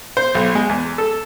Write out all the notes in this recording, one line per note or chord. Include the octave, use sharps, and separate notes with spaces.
C5
B1
G#3
E2
A4